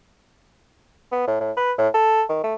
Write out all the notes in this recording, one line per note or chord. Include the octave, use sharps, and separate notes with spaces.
B3
A2
A2
B4
A2
A4
D#3
A3